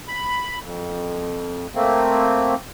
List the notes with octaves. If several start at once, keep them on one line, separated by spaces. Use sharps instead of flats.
B5
F2
A3 A#3 C4